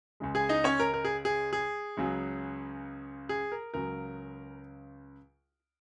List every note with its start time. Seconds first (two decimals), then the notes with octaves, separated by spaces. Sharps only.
0.20 C#2 C#3 G#3
0.35 G#4 G#5
0.49 D#4 D#5
0.64 C#4 C#5
0.80 A#4
0.94 A#4
1.05 G#4
1.25 G#4
1.53 G#4
1.97 C#2 C#3 F#3
3.29 G#4
3.52 A#4
3.74 C#2 C#3 F#3 A#4